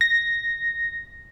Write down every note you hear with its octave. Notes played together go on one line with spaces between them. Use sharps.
A#6